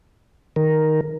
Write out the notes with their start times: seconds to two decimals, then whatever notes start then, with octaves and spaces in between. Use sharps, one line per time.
0.56 D#3 A#4